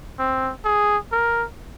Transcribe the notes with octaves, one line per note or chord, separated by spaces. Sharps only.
C4
G#4
A#4